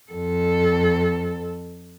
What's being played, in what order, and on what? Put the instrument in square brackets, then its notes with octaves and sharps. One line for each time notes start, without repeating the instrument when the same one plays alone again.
[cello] F2 A4